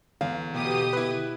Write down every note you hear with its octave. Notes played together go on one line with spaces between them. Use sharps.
E2 D3 F5
B2 G4 D#6
E4 B4